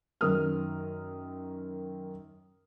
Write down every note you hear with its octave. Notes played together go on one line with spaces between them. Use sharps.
F#2 D#3 A#4 D#6 F6